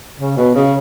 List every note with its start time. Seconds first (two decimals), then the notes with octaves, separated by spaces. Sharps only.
0.20 C#3
0.37 B2
0.55 C#3